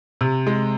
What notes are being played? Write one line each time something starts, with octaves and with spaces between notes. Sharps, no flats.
C3
G#3